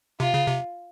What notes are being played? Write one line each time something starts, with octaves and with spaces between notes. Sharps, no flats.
C3 F4
C#3
C3